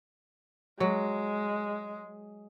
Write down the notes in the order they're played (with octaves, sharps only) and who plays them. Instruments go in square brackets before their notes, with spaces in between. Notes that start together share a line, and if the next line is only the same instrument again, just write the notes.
[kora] F#3 [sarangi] G#3